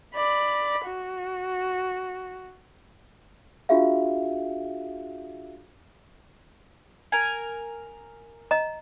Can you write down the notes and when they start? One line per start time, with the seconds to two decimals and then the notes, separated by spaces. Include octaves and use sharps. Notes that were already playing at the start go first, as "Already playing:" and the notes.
0.15 D5 B5
0.86 F#4
3.69 D4 F4 F#4 G#4 E5 F5
7.12 A#4 G#5
8.51 D#5 A#5